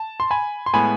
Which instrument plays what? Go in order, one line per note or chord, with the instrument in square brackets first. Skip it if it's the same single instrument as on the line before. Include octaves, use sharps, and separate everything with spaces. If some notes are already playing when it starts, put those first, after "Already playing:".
Already playing: [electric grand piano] A5
C6
G#5 B5
C6
A2 G#3 B3 G#5 B5